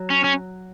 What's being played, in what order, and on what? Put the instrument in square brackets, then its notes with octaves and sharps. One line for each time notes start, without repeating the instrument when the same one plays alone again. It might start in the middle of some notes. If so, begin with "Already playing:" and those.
Already playing: [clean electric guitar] F#3
[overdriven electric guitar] C#4
C#4